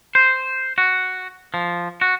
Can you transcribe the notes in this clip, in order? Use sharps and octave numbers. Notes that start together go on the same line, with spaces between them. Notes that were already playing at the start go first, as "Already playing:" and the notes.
C5
F#4
F3
F#4